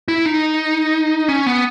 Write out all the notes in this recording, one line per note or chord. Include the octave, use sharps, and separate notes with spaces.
E4
D#4
C#4
B3